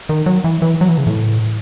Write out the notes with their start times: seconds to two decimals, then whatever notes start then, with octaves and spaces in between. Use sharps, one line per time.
0.09 D#3
0.26 F#3
0.44 E3
0.62 E3
0.81 F#3
0.89 E3
0.98 C#3
1.07 A2